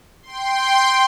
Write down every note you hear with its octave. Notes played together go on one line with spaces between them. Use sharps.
G5 C6